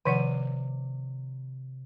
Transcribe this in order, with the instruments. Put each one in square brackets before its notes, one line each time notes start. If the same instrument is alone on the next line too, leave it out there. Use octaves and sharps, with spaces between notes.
[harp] C3 D5 D#7 [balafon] D#3 F3 F#5